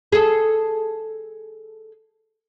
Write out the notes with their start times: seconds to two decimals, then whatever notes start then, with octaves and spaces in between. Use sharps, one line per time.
0.12 G#4 A4